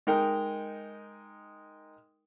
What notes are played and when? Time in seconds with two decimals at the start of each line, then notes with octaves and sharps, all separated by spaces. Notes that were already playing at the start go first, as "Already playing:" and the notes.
0.07 G#3 D#4 A#4 G5